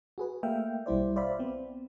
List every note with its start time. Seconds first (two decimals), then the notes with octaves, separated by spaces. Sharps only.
0.18 F#4 G#4 B4
0.43 A3 A#3 E5 F5 G5
0.86 B1 G3 E4 C5 D5
1.16 C5 D5 E5 F5 B5
1.39 B3 C4